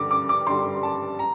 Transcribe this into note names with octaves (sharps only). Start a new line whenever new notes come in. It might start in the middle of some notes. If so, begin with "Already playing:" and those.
Already playing: G2 D3 G3 D6
D6
D6
G2 D3 G3 C6
A5
A#5